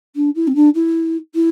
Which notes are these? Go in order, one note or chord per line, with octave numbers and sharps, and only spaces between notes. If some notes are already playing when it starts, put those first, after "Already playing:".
D4
E4
C4
D4
E4
E4